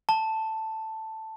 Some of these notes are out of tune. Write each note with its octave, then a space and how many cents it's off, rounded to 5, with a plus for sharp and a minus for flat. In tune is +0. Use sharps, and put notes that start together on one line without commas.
A5 +5